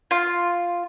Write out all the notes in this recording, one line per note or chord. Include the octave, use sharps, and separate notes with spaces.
F4